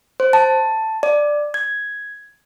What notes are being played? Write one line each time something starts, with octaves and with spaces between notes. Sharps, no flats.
C5
A5
D5
G#6